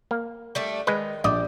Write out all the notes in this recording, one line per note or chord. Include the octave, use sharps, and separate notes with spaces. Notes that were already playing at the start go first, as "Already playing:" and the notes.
A#3
G3 A3 D4
D#3 G#3 B4
A#1 G3 D#5 D6